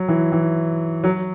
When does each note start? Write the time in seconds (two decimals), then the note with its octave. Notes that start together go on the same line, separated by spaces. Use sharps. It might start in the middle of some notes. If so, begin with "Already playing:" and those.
Already playing: F#3
0.08 E3
0.32 E3
1.04 F#3